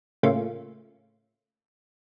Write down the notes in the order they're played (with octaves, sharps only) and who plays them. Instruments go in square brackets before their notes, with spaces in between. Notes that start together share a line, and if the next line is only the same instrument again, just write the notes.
[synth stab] A2 C#3 A3 A#3 C#4 F4